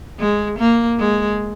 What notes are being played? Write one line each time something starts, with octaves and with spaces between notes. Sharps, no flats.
G#3
A#3
G#3